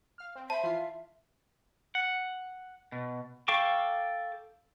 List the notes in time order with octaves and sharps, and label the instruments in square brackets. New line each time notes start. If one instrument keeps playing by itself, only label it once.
[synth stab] F5 F6
C4
[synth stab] C5 B5 [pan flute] E5 [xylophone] A5
[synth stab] E3 F4 C7
[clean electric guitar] F#5
B2
[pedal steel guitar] A4 F5 G5 C#6 D6